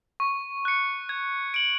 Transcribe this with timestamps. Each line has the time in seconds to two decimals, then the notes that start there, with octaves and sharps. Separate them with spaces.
0.20 C#6
0.65 F#6 C#7
1.09 G#6
1.54 D7 F#7